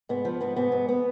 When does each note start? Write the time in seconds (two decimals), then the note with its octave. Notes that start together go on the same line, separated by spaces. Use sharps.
0.09 G#2 B3
0.25 F3
0.41 G#2 B3
0.56 G#2 B3
0.72 G#2
0.89 B3